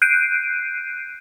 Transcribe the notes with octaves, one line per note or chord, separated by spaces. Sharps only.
F#6 G6 C7 D7 D#7